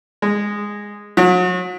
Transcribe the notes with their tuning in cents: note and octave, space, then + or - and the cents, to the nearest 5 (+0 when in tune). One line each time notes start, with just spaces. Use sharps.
G#3 -10
F#3 -40